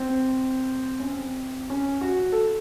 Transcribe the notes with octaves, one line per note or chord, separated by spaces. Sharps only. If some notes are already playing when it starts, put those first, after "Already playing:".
Already playing: C4
C#4
C4
C#4
F#4
A4